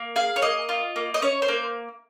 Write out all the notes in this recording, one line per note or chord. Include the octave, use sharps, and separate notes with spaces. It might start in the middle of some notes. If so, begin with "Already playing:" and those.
Already playing: A#3
G#4 F5
C#5
A#3 D#5
F4
A#3
D#5
C#4 C#5
C5
A#3